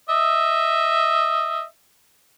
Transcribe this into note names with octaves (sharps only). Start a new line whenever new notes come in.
D#5 E5